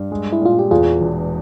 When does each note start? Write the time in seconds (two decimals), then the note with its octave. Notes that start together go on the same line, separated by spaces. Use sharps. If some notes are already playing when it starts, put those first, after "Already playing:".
Already playing: G2
0.12 G#3
0.33 E4
0.42 A#2 F4
0.59 G4
0.71 E2 F4 G#4
1.01 E1